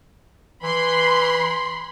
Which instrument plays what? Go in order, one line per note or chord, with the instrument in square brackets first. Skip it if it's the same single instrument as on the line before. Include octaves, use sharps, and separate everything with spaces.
[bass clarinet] E3 [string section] B5 C6